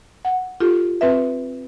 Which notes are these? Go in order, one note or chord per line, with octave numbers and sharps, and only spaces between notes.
F#5
F4 G4 A4
C4 B4 E5